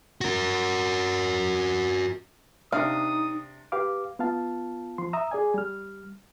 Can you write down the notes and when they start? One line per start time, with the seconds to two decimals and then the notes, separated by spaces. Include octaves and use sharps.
0.21 F#4 A#4
2.72 C3 D4 D#4 F5 D#6
3.72 G4 B4 F5 D6
4.19 B3 F4 F5 A5
4.98 F3 C6
5.13 E5 A#5 D#6 E6
5.31 G#4 D5 G#5
5.54 G3 F6